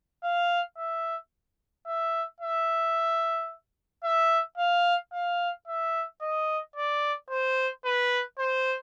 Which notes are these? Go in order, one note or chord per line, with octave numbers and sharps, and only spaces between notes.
F5
E5
E5
E5
E5
F5
F5
E5
D#5
D5
C5
B4
C5